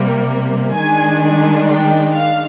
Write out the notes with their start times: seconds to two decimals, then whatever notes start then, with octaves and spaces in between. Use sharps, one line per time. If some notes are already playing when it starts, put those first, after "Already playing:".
Already playing: C3 G3 A#3
0.77 D#3 G#3 D4 G#5
1.23 G#5
1.69 G5
2.14 F5